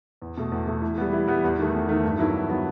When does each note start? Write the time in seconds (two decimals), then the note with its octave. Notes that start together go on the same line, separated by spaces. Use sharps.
0.22 E2
0.38 B2 A3
0.52 E2
0.67 B2 A3
0.82 E3
0.98 G3 B3
1.13 E3
1.27 G3 B3
1.44 E2
1.59 D#3 A3
1.73 E2
1.89 D#3 A3
2.04 G2
2.19 D#3 F#3 B3 E4
2.34 G2
2.50 D#3 F#3 B3 E4